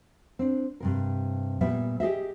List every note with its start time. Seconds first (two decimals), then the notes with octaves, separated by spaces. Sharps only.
0.39 C4 D4
0.80 G2 C3 A#4
1.61 A#2 G3 B3 E5
2.00 G4 G#4 D#5 E5